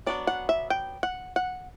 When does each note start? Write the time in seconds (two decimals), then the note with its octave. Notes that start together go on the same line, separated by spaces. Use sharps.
0.06 F#3 B3 D4 D5
0.27 F#5
0.49 E5
0.70 G5
1.03 F#5
1.36 F#5